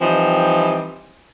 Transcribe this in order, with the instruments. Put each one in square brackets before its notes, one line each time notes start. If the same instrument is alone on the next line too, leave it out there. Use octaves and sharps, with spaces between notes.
[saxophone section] E3 F3 G3 C4 D#4